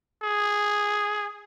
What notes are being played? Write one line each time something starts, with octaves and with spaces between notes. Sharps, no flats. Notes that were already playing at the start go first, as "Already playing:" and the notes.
G#4